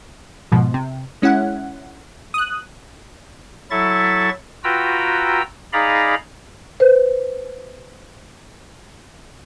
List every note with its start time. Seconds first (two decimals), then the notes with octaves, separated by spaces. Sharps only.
0.52 G#2 B2 F3
0.74 C3
1.22 G#3 C#4 E4 F#5
2.34 D#6 F#6
3.71 F#3 E4 A4 E5 C#6 A6
4.64 F4 F#4 B4 G5 A#5 E6
5.73 D#4 G#4 D5 F5 A#5 B5
6.80 B4 C5